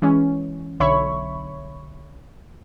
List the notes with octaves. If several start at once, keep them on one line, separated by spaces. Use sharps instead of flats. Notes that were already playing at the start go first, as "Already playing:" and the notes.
E3 G#3 C#4
B1 D3 C#5 E5 B5 C#6